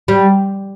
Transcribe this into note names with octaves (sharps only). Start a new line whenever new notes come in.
G3